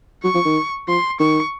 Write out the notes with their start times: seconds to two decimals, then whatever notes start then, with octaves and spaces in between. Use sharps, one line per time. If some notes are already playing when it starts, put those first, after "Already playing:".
0.24 F#3 C#6
0.35 F3
0.45 D#3
0.88 F3 C6
1.20 D#3 C#6